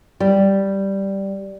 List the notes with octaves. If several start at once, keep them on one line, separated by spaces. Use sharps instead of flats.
G3